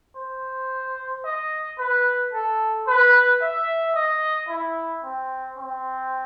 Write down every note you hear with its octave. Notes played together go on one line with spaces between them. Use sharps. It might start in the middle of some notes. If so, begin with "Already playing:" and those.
C5
D#5
B4
A4
B4
E5
D#5
E4
C4
C4